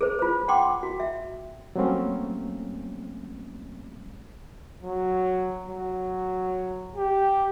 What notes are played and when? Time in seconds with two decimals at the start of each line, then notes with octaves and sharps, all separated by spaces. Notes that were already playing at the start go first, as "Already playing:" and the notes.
0.01 G#4 B4 C5
0.19 F4 C5
0.48 F#5 G5 C6 D6
0.83 F#4
1.00 E5
1.76 F#3 G3 A3 A#3 C4 C#4
4.84 F#3
5.69 F#3
6.96 G4